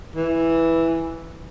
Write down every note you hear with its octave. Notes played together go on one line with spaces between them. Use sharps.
E3